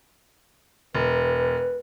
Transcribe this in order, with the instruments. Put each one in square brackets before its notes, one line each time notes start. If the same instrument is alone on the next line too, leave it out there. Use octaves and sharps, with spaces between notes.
[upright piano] E1 [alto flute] B4